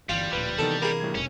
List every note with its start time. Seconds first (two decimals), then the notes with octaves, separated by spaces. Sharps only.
0.09 G1 E3 G3 F4
0.32 D1 A#2 F3 G3 B4
0.59 C3 D#3 E3 B3 A4
0.82 A#3 G#4 B5
1.00 A2 G3 G#6
1.15 F1 B2 C#4